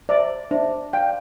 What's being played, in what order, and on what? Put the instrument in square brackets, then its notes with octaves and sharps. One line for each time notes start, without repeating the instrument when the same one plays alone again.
[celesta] C5 E5 [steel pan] D5
[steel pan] D4 [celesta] C5 E5
[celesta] D5 F5 [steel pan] G5